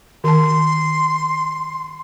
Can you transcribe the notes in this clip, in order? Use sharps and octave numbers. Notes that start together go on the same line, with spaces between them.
D#3 A5 C6